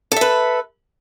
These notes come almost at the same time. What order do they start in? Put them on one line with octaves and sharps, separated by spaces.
A4 E5 B4